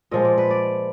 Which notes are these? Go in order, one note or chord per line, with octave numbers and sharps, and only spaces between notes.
A#2 F3 G#3 D#5
D5
B4
D5